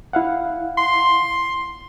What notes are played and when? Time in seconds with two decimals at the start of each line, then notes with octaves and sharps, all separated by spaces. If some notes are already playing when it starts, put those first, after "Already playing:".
0.13 E4 F5 F#5
0.78 C6